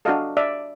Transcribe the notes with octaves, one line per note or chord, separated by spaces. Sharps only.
D4 F#4 A4 D#5 F5
D5 E5